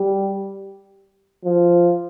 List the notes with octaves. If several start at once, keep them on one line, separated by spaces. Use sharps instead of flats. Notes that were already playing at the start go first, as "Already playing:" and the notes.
Already playing: G3
F3